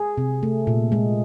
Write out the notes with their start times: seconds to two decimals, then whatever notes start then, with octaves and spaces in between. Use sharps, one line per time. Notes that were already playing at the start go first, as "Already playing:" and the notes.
Already playing: G#4
0.18 C3
0.43 A3
0.67 A#2
0.92 G#3